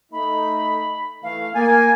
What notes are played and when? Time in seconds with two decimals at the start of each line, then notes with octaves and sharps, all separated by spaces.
0.12 A3 D#4 B5
1.23 E3 A3 F5
1.55 A#3 G#5 A6